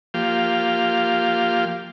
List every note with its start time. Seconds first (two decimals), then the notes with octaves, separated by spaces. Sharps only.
0.14 F3 A#3 G4 F5